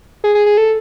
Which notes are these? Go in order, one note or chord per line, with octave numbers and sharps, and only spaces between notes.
G#4
G#4
G#4
A4